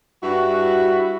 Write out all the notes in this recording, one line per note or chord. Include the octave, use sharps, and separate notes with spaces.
G2 E4 F#4